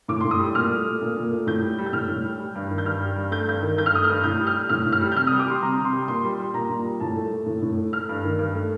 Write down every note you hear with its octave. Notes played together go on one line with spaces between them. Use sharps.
A2 D6
C6
A2
D#6
G3
A#2 F6
A3
A3
A#2
A#2
A3
A2 G6
G3
G3
G6
A2 F6
A2
G3
G3
G2
D#3
G6
G2 F6
G3
G2
A3 G6
G2 G6
D#3
G2 G6
F6
A3 D#6
G2 F6
A2 G6
G3
F6
G3
A2 F6
A2
F6
G3
G6
C3 F6
D#6
G3
D6
G3 C6
C3 A#5
C3
C6
G3
A#2 C6
G3
G3
A#2 A#5
A#2
G3
A2 A5
A3
A3
A2
A2
A3
A3 F6
G2
D#3
G2
A3